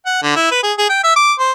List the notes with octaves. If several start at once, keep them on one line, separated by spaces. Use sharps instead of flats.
F#5
D3
E4
B4
G#4
G#4
G5
E5
D6
C5